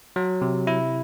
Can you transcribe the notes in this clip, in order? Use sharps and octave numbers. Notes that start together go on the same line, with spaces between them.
F#3
C3
E4